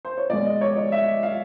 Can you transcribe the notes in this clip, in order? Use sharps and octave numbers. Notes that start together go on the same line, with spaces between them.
C5
C#5
B2 G#3 D5
D#5
C#5
D5
E5
F5